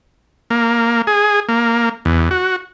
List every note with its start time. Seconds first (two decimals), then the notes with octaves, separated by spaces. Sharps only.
0.50 A#3
1.07 G#4
1.49 A#3
2.05 E2
2.31 F#4